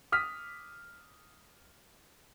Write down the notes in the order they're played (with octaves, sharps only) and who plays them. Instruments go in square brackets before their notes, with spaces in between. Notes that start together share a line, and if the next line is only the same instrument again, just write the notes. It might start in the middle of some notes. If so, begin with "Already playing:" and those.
[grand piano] D#6 F6 B6